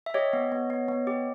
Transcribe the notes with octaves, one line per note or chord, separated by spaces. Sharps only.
E5
G4 C#5 D#5
B3
B3
B3
B3
G4